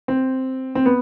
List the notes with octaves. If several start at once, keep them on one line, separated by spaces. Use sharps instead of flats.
C4
C4
B3